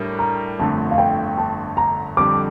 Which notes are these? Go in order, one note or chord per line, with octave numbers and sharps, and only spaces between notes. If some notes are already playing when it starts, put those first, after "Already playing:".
Already playing: A2 G3 D4 A#4
A#5
G1 F2 D3 A3 A5
F5
G5
A5
A#5
F2 D3 G3 D6